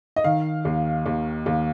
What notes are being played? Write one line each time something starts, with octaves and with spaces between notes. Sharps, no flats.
D#5
D#3 F5
D#2
D#2
D#2